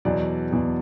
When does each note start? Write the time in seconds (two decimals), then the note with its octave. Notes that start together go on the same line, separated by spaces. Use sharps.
0.05 E2 B2 F#3 D5
0.52 E2 B2 F#3